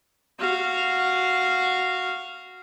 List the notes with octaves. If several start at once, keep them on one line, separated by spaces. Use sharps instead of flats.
F#4 F5